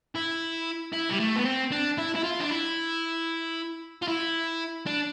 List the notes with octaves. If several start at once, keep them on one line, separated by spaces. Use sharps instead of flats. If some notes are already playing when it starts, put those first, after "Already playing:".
E4
E4
G3
A3
B3
C4
D4
E4
E4
F4
D4
E4
F4
E4
D4